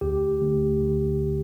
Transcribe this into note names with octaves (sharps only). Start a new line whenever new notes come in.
D2 G4
D2
D3